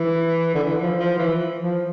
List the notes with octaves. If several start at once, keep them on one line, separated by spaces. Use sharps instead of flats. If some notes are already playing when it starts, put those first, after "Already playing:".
Already playing: E3
D3
E3
F3
F3
E3
F3